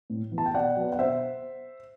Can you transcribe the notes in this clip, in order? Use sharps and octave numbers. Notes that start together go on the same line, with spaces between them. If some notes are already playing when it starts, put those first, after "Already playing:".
A2
E3 B3
A5
G5
B2 D5 F#5
F#3 B3
F#5
B2 C5 E5